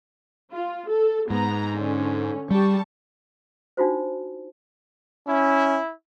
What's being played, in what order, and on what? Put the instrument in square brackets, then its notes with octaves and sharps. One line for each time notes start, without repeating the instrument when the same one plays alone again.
[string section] F4
A4
[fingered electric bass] G#2 [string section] B3 A#5
[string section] D3 C#4
[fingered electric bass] G3 [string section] G4 A5 C#6
[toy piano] D4 D#4 F4 F#4 C5
[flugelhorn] C#4 [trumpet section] E4